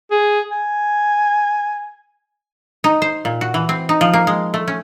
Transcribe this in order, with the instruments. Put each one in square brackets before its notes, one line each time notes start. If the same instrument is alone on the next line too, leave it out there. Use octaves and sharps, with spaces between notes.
[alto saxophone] G#4
G#5
[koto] D#4
C5
A#2
F#4
E3
C4
D#4
F3
A#3
G#3
A3
C#4